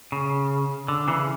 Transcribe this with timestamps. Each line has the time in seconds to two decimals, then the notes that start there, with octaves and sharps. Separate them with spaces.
0.12 C#3
0.88 D3
1.08 C#3 E3